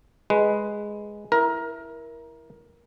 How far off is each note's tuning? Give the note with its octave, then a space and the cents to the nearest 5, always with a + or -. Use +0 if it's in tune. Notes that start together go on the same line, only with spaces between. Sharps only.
G#3 +0 B4 +0
E4 +0 A#4 +15